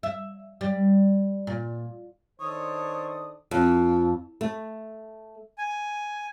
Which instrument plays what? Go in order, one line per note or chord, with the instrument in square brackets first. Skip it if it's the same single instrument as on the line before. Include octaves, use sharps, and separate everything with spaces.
[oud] E5
G3
A#2
[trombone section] D#3 D4 C5 [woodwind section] A4 D#6 [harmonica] C#5
[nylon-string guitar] F2
A3
[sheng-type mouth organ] G#5